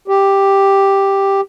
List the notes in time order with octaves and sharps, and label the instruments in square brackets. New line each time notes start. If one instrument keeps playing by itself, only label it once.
[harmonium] G4